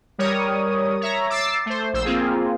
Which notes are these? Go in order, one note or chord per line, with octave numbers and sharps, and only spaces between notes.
G3 A#4 C#5 D#6
C#5 E5 A#5
D6 E6 A6 C7
A3 C5
A#1 C5 E6
A#3 C4 F4 G#4